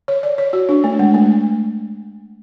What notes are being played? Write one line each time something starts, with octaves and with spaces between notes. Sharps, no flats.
C#5
D5
C#5
F#4
D4
A3
G#3
A3